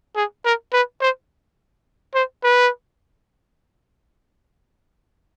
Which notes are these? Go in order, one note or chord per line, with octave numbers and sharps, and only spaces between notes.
G#4
A#4
B4
C5
C5
B4